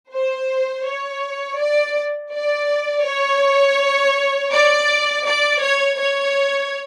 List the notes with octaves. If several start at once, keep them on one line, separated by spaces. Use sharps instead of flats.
C5
C#5
D5
D5
C#5
D5
D5
C#5
C#5